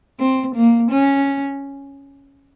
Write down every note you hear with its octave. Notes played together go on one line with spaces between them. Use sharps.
C4
A#3
C#4